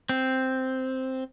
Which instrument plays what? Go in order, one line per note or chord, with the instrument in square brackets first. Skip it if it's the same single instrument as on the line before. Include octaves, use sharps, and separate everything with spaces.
[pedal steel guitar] C4